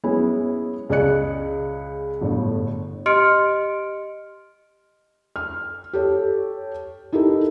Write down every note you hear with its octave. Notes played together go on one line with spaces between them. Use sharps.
F#3 G#3 B3 C#4 E4
C#2 G#4 D5 D#5 F#6 C#7
G1 A2 D3
G4 D#5 C6 F6 C#7 D7
F6
G4 A4 C#5
D#4 E4 G4 A4 A#4